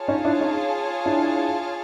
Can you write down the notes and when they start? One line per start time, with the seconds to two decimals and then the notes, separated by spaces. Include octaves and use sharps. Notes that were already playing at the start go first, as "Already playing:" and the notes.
Already playing: F4 G#4 C#5 F5 A5
0.08 C#4 D#4
0.25 D4 E4
0.41 C#4 D#4
1.06 D4 E4